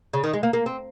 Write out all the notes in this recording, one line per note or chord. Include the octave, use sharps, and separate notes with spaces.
C#3
D#3
G#3
A#3
A#3
C4